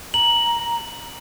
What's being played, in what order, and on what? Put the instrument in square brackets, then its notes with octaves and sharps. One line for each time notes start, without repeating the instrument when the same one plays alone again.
[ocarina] A#5 [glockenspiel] F#7